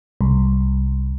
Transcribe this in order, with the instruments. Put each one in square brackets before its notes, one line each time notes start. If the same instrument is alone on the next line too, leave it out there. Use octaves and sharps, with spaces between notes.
[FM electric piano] C2